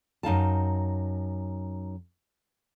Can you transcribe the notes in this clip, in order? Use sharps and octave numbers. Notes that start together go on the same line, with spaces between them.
F#2 D#4 F5 A5